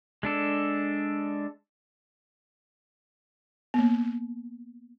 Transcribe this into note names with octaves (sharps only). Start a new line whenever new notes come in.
G#3 D4 A4
A#3 B3